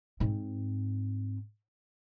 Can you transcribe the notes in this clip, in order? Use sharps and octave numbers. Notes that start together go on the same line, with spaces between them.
G#2 C4